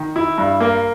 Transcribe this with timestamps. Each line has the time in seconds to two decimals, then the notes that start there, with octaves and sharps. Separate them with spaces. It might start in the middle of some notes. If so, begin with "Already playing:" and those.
Already playing: D#3
0.16 E4
0.38 G2
0.60 A#3